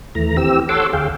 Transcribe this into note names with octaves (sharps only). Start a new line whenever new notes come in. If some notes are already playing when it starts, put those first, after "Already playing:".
D#2 E3 A3 A#5
E3 C4 G4 E6
A4 C#5 F#5 C6 D6 E6
D2 G#4 F5 G5